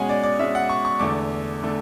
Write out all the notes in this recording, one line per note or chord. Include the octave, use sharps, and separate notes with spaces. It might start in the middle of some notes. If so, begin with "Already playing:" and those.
Already playing: B2 G#3 C#4 F#5 G#5
D5
D5
B2 G#3 C#4 E5
F#5
C#6
C#6
E2 D3 A3 D6
D3 A3